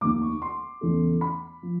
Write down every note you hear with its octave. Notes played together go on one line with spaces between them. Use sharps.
F1 D#2 D#3 D6
C#6
C6
E2 C#3 E3 A3
B5
F3